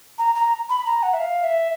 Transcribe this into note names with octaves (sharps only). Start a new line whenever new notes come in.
A#5
A#5
B5
A#5
F#5
E5
F5
E5